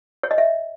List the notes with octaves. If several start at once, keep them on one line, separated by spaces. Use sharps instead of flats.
C#5
D#5
E5